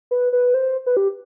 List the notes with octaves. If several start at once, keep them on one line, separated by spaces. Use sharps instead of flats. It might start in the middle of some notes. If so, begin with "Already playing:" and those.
B4
B4
C5
B4
G4